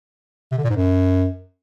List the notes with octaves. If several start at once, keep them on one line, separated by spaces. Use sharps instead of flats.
C3
D3
A#2
G#2
F#2